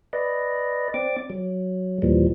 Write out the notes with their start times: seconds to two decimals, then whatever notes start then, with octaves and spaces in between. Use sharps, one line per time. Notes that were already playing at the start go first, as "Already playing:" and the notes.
0.13 B4 D5 D#5
0.94 C4 D5 D6
1.30 F#3
2.02 D#2 A#2 E3 F3 G3